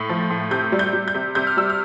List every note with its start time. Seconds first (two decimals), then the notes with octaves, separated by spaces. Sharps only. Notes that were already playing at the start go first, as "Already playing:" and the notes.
Already playing: A2
0.09 F3
0.30 A2
0.51 C3 G6
0.72 G3
0.79 G6
0.93 G3
1.08 G6
1.15 C3
1.35 C3 G6
1.47 F6
1.57 G3 E6
1.70 F6